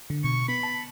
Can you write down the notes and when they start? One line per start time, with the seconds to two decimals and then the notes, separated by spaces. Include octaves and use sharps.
0.10 D3
0.24 B2 C#6
0.48 B3 B5
0.63 A5